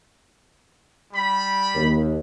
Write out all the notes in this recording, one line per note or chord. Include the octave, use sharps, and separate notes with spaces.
G3 B5
D#2